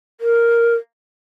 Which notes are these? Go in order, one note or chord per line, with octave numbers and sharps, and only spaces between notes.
A#4